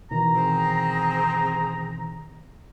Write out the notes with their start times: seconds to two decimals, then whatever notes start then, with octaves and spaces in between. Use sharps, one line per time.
0.11 B2 D#3 E3 A#5
0.36 C4 G#4